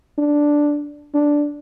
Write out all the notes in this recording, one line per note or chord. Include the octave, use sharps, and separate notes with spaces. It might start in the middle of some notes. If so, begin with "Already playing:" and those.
D4
D4